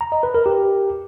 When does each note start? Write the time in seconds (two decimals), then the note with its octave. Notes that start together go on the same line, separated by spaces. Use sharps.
0.01 A#5
0.12 D#5
0.23 B4
0.34 A#4
0.46 G4